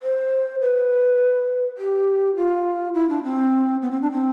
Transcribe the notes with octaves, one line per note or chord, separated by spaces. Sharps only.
C5
B4
G4
F4
E4
D4
C4
B3
C4
D4
C4